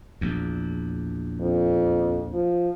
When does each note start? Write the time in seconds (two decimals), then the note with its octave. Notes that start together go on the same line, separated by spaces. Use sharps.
0.21 A#1 E2
1.40 F2
2.33 F3